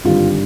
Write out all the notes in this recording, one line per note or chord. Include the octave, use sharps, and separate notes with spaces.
G#1 G2 D3 G3 F4